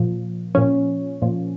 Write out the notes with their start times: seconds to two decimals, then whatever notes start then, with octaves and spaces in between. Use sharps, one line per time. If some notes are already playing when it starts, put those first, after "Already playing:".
Already playing: A#2 F3
0.55 A#2 F3 C#4
1.22 A#2 F3